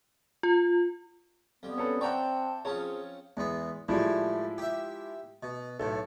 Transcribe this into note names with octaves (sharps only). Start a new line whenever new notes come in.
F4
F2 G3 B3
C#4 A4 B4
C4 D5 E5 F#5 G5 A5 A#5 C#6
F3 C4 C#4 F4 G#4 C#5 A5
E2 G#3 B3
A2 F3 G3 G#3 E4
G4 E5
B2
B1 A2 A4